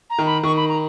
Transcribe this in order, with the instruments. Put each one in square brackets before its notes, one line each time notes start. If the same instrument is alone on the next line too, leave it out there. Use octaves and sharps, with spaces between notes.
[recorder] A#5
[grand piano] D#3
[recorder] B5
[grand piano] D#3 [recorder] C#6
[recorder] B5
A#5